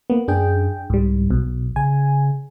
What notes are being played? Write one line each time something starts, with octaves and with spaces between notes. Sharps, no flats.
A#3 B3
F#2 D4 G#4 G5
C2 G#2 G3
B1 B2
C#3 G#5